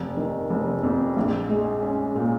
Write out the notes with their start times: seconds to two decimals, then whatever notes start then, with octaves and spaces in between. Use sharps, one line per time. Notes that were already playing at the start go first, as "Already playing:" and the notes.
Already playing: F1
0.17 D#3
0.50 F1
0.83 F2
1.17 A#1
1.49 G#3
1.82 C#4
2.15 A#2